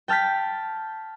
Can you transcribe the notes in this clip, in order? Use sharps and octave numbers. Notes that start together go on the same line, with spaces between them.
G5 A5 F6 G6 B6